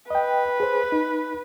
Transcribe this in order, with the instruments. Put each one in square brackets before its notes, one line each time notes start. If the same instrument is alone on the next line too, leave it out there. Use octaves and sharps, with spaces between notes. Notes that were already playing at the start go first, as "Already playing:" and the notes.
[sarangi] B4 [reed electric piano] D#5 G5
[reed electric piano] G#4 C5
D#4